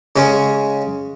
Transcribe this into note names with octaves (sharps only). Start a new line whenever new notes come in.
C#3 G#3 C#4